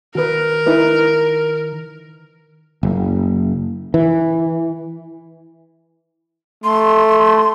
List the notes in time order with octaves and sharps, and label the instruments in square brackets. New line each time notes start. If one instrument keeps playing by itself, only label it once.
[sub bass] D#3 [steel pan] F#4 B4 [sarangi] A#4
[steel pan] D#4 E4 B4
[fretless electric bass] F#1
E3
[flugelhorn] A3 [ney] C6